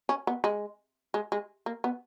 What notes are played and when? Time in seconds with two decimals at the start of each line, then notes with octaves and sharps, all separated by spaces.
0.09 C#4
0.27 B3
0.44 G#3
1.14 G#3
1.32 G#3
1.66 A#3
1.84 B3